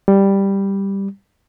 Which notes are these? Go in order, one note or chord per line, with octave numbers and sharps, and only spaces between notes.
G3